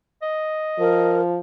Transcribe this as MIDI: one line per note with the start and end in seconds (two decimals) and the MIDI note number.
0.22 1.20 75
0.79 1.39 53
0.79 1.21 70